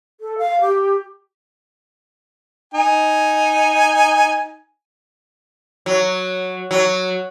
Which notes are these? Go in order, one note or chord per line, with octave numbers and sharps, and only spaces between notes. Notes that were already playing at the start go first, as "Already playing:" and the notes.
A4
F5
G4
D#4 G#5
F#3
F#3